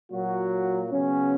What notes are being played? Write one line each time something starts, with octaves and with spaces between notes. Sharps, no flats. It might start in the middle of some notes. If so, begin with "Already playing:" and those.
A#2 F#3 A#3 F#4
C#3 F#3 B3 C#4